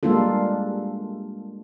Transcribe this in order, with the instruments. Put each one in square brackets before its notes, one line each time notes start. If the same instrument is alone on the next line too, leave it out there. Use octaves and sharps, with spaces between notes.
[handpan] G3 G#3 A#3 D4 F4 A4